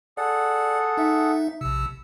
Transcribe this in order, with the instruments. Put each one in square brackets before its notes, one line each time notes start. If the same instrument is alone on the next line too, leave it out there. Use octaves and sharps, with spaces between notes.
[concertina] G#4 A4 F#5 [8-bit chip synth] D5
[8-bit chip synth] D#4 E5
[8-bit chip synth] A#1 C3 [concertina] E6